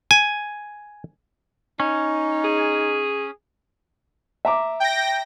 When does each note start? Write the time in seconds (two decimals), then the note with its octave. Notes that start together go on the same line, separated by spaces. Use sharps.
0.11 G#5
1.80 C#4 D#4
2.44 G#4
4.45 E5 A#5 D6
4.80 G5 A#6